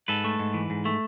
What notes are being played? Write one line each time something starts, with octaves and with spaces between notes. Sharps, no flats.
G#2 A4 B4
A3
G#2
E3
G#2
A3